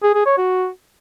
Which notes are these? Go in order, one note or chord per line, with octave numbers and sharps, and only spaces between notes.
G#4
G#4
C#5
F#4